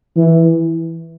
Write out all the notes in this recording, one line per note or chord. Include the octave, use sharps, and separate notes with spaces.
E3